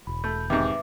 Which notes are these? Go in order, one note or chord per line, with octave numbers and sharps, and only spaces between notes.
E1 B5
A3 G6
G#2 C3 D#3 B4 E5 D6